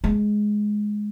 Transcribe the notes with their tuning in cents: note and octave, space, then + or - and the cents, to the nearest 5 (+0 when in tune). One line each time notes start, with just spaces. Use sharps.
G#3 +10